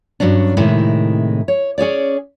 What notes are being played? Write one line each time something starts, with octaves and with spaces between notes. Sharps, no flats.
G2 A#2 F#3 C#4 D4
A2 C3 D#3 G#3 E4
C#5
C#4 G#4 C#5 D5